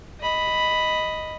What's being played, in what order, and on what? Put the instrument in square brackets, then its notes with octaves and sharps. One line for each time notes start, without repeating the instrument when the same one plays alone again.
[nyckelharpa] D#5 B5